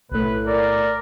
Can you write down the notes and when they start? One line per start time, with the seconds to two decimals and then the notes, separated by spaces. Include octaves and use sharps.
0.12 B1 A2 A3 B4
0.47 A#4 D5